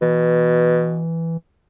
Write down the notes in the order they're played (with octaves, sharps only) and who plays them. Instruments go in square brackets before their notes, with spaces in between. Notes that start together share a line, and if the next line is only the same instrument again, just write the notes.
[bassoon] B2 [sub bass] E3